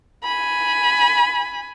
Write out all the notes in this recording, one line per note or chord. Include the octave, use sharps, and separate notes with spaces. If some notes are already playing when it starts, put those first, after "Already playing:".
G#5 B5